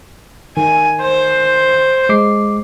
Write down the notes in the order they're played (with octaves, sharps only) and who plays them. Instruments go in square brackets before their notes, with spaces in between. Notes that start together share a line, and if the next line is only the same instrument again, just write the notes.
[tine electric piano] D#3 [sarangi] G#5
[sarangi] C5
[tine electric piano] G#3 D6 C7